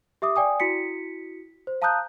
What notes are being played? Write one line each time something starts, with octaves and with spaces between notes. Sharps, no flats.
G4 E5 D6 D#6
D5 G5 G#5 D#6
E4 F#4 B6 C#7
C5
F5 A5 A#5 D#6 F#6 G6